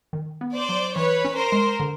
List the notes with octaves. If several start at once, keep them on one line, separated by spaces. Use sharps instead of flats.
D#3
B3
C5 D5
F#3
E3 B4 C#5
C#4
A#4 C5
G#3
D3